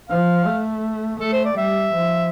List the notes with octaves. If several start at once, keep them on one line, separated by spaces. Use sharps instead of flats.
F3 F5
A3
A3 A4
C5
D5
G3 E5
F3